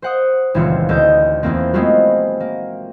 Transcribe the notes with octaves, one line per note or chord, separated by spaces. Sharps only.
C5 F#5 D#6
D#1 C#2 E3 C4 F4 C#7
D2 A4 D#5 G6
E2 E3 A3 A#3 C4
G#3 A3 B3 C4 F4 F#4
A#3